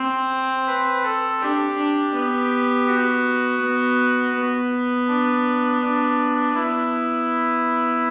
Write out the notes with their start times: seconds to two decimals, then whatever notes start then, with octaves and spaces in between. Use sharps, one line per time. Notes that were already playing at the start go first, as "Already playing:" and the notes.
Already playing: C4 C5
0.67 B4
1.04 A4
1.40 D4 G4
1.78 D4
2.14 B3
2.87 F#4
3.61 B3
4.35 B3
5.08 D4
5.82 D4
6.55 B3 E4